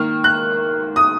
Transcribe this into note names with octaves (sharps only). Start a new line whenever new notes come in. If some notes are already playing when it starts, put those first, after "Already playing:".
Already playing: D#3 A#3 F6
F#6
D#6